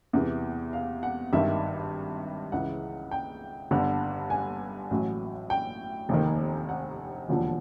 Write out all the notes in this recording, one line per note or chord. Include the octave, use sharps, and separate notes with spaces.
E2 C3 E3
F5
F#5
G#1 G2 D#3 E5
C#2 C#3 E3 F#5
G5
G1 G2 D3
G#5
A1 A2 F#3
G5
F1 D#2 D#3
F#5
E1 D#2 D3 F3